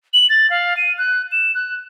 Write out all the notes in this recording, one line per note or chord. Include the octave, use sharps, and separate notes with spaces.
F#7
A6
F5
D#7
F#6
E7
F#6